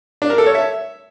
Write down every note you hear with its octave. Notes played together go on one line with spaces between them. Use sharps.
D4
A#4
A4
C#5
E5